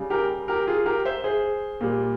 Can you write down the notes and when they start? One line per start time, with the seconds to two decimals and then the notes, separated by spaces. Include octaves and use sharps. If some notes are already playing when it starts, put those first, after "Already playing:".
Already playing: C#3 G3
0.10 G4 A#4
0.48 G4 A#4
0.67 F4 G#4
0.86 G4 A#4
1.05 C5 E5
1.24 G#4 C5
1.81 A#2 G3